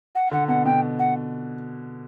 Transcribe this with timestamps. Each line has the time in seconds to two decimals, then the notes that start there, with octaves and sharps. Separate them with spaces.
0.15 F#5
0.31 D3 F#5
0.48 B2 F#5
0.65 B2 G5
0.99 F#5